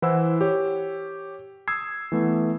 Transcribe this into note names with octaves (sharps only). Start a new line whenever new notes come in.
E3 E4 C5 F#5 E6
G4 C#5
D#6 E6 G#6 C7
E3 A3 B3